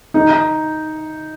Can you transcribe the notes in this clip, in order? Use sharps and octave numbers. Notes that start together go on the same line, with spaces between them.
D#4